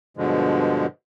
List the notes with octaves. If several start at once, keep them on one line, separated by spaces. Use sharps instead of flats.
G2 B2 D3 F3 G#3